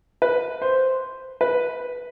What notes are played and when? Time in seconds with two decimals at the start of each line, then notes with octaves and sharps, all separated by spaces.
0.22 B4
0.62 C5
1.41 B4